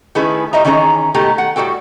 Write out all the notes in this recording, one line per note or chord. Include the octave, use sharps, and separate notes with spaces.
D#3 A3 C#4 E4 G#4 B4
A2 G3 D#5 E5 A#5
D#3 E3 C#4 G#4 A#5
B2 D#3 G#3 A3 G4 A#5
F#5
A2 G3 F#4 A4 G5